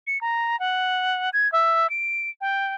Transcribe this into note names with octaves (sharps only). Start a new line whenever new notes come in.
C#7
A#5
F#5
G#6
E5
D7
G5